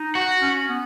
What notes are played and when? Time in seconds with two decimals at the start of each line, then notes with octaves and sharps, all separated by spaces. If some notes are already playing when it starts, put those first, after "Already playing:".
Already playing: D#4
0.15 F#4
0.42 C#4
0.69 B3